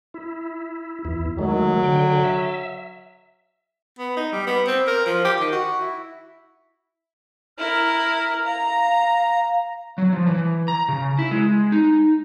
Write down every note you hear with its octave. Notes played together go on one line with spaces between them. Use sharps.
E4
E2 E4
D#3 F#3 G#3 A3
D3 G5
E5
B3
D#4
G3
B3
C4
A#4
F3
G4
D#3
F#4
E4
E4 A#4 F6
F5 A#5
F#3
F3
E3
A#5
C#3
E4
G#3
D#4